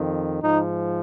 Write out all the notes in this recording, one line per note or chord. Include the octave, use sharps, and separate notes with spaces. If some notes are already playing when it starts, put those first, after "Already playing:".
Already playing: F2 D#3
G#2 F3 D#4